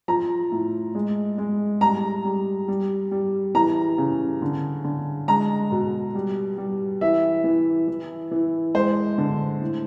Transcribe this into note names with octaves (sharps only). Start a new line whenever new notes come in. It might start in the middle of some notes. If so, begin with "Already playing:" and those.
F3 A#5
A2
G#3
G#3
G3 A#5
G3
G3
G3
E3 A#5
C#3
D3
D3
G#3 A#5
B2
G3
G3
E3 E5
E3
E3
E3
G#3 C5
D3
A2